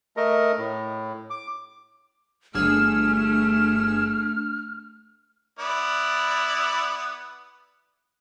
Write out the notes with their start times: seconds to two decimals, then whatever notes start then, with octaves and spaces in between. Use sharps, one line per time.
0.17 A3 A#4 D#5
0.58 A2
1.30 D6
2.55 G1 A3 D4 G#4 E6 F6
5.59 B3 E4 D5